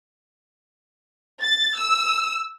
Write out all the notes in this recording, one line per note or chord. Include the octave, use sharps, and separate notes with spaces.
A6
E6